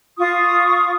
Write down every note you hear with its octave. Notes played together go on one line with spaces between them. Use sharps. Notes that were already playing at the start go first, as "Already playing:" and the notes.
F4 C#6 D#6